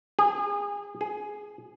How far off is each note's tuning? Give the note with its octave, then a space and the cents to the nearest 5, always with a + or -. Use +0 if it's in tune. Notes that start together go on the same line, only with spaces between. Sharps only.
G#4 -30
G#4 +10